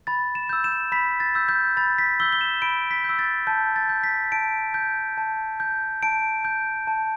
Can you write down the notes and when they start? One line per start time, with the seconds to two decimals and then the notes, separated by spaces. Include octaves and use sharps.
0.07 B5 A6
0.35 E7
0.49 E6 G6
0.64 E7
0.92 B5 B6
1.20 A6
1.35 E6 G6
1.49 G6
1.77 B5 A6
1.98 B6
2.20 E6 G6 G7
2.32 G7
2.41 E7
2.62 B5 D7
2.91 B6
3.04 E6 G6
3.19 A6
3.47 A5 G6
3.76 A6
3.89 G6
4.04 B6
4.32 A5 D7
4.74 G6
5.18 A5
5.60 G6
6.03 A5 D7
6.45 G6
6.87 A5